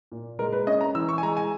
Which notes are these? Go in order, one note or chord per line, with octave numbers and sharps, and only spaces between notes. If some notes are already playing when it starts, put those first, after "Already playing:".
A#2
G#3 A#4
B4
C#4 D#5
A#5
E3 E6
C#6
G#5
G#3 A#5
G#5